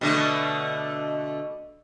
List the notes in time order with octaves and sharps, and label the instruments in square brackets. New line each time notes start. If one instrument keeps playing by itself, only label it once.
[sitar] B2 D3 A3